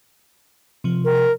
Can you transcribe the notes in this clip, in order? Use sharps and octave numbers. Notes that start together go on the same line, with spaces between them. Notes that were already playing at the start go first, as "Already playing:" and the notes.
C3 F3
A#4